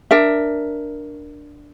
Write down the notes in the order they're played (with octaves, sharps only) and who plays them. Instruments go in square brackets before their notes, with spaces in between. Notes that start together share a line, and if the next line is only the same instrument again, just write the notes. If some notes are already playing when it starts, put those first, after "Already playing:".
[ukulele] D4 A#4 E5